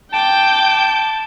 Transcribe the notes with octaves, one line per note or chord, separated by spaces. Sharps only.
G5 A5 D6 G6